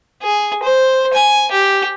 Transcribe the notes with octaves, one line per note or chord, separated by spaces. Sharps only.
G#4
C5
G#5
G4